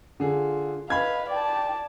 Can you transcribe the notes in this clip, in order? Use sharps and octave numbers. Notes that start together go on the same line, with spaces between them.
D3 F4 G#4
B4 D#5 F5 B5 G#6
D5 G5 A5